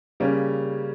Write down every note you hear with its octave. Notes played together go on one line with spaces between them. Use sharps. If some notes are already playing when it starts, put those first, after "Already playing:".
C#3 G3 A#3 C#4